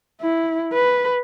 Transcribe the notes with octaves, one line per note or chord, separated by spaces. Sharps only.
E4
B4